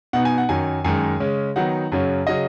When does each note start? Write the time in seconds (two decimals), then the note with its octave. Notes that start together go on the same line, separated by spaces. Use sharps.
0.13 B2 B3 D#4 F#5
0.25 G#5
0.38 F#5
0.49 F#2 D#3 F#3 G#5
0.84 F#2 D#3 G#3 G#5
1.20 C#3 G#3 C#4
1.56 D#3 F#3 B3 D#4 F#5
1.92 F#2 C#3 F#3 C#4
2.27 C#3 F#3 C#4 D#5